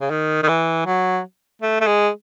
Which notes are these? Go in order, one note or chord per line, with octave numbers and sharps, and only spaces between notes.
C#3
D#3
D#3
E3
F#3
A3
A3
G#3